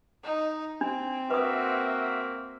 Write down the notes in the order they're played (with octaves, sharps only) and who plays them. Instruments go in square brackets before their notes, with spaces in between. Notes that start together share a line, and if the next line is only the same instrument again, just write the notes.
[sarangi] D#4
[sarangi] C4 [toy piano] D4
[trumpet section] A#3 F#4 E5 [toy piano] B4 D#6